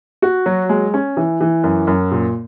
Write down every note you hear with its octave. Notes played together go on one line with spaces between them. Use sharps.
F#4
F#3
G#3
C#4
E3
E3
F#2
F#2
A#2